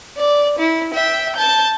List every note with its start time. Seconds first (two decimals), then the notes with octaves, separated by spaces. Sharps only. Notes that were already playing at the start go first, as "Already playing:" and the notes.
0.18 D5
0.59 E4
0.94 E5 G5
1.36 A5 G6